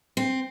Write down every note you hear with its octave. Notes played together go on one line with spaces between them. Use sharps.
C4